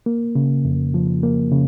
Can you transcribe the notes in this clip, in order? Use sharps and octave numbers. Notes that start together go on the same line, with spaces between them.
A#3
C#3
F2
F3
A#3
C#3